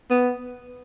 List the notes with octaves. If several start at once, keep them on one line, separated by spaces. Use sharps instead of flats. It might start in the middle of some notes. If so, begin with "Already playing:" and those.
B3